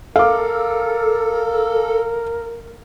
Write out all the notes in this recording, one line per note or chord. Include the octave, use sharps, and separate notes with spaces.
A4 A#4 F5 D6